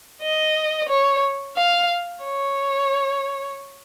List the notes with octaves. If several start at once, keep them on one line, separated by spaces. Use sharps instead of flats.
D#5
C#5
F5
C#5